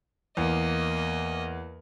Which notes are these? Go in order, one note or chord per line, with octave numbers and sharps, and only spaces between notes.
E2 A#3 D#5